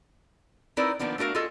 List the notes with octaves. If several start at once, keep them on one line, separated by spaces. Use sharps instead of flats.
C4 D#4 E4 A#4 B4 D5
D#3 F3 A#3 B3 D4
A3 D4 F#4 A#4 F5
F4 F#4 G#4 A4 D#5